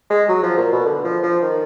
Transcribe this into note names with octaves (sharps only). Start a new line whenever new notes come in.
G#3
F#3
F3
A#2
B2
D3
F3
F3
D#3